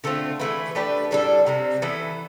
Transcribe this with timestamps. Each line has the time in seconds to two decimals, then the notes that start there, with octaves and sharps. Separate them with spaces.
0.04 D3 A3 C4 F4
0.40 E3 A3 E4 B4
0.75 A3 D4 G4 B4
1.11 A2 G3 D4 A4
1.46 C3 G3 C4
1.82 E3 B3 E4 A4